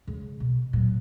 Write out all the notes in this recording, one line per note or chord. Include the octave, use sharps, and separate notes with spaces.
C#3 G#3
B2
A#2 F#3